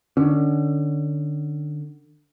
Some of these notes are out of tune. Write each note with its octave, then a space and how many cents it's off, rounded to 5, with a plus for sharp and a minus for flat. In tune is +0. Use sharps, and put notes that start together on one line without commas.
D3 +30 C#4 +25